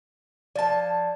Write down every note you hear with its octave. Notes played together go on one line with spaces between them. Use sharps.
F3 D5 A5 A6